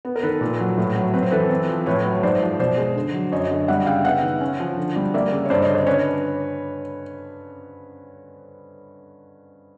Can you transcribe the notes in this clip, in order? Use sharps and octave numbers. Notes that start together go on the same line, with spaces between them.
B3
A#4
D#3 A4 B4
A#2
F#3
A2
F#3
C4 B4
C5
E3 A4 B4
C4
F3
A2 B4 C#5
F#3
G#2 C5 D5
F3
B2 C5 D5
G#3
D3
F#3
F#2 C#5 D#5
D3
G3 E5 F#5
C#3 F5 G5
B3 E5 F#5
D#3
C#4
F3
D3
G3
A#3 D5 E5
C#3
C#5
G2 C5 D5
C#5 D#5
D3
C5 D5
C#4 B4 C#5